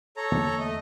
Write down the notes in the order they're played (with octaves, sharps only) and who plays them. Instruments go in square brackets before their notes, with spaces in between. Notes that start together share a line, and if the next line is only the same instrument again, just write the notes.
[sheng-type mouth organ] A4 C#5 A#5
[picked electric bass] E2 D3 A#3
[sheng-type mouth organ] A3 D#5